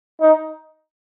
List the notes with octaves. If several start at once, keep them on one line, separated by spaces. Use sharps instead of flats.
D#4